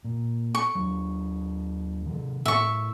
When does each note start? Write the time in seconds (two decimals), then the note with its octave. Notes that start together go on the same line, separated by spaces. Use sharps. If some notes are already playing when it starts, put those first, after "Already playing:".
0.04 A#2
0.55 C#6
0.75 D#2 F#3
2.06 C3 D#3
2.46 A2 B3 E5 C#6